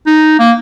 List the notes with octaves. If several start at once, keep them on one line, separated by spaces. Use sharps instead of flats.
D#4
A#3